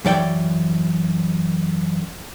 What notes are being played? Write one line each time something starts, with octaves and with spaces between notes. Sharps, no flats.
F#2 E3 D5 G5